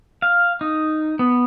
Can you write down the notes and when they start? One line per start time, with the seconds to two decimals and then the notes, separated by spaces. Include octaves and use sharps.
0.22 F5
0.61 D#4
1.19 B3